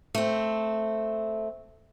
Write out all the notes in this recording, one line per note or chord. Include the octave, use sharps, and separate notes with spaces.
A3 C4